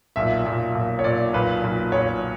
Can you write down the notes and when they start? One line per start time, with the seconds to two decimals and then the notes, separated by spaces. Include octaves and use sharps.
0.16 B1 A#2 E5
0.45 B1 A#2
0.75 B1 A#2
0.99 C#5
1.04 B1 A#2 D5
1.33 B1 A#2 B4
1.63 B1 A#2
1.92 B1 A#2 C#5